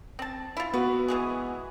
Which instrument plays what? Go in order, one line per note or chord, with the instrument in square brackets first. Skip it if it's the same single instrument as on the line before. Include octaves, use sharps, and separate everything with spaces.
[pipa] C4 A5
E4 F4
[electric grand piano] B3 F#4 [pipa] B4
[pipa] E3 G#3 G#4